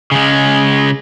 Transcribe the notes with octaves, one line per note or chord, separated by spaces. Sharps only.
C#3 G#3